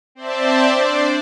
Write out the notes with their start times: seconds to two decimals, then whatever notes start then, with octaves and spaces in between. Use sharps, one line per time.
0.15 C4 C5 D5 E5 A5
0.73 D4 C5 D5